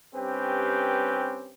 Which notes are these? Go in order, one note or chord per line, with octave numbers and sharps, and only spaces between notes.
G2 C4 C#4 G4 B4